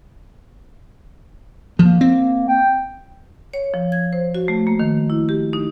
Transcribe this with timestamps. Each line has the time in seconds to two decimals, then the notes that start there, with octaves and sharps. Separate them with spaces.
1.79 F3 A#3
2.01 C4
2.48 G5
3.53 C#5
3.74 F3
3.92 G#6
4.13 C5
4.35 F#4
4.48 A3
4.67 A#3
4.80 D#3
5.10 E4
5.29 G4
5.53 D#4